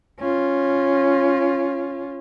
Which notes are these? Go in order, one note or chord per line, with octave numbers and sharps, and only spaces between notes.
C#4 F4